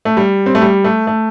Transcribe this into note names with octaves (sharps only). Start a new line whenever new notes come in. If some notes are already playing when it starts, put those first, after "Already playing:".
A3
G3
C4
A3
G3
A3
A3